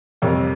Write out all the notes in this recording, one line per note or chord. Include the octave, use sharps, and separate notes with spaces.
F2 C3 G3 A#4 C#5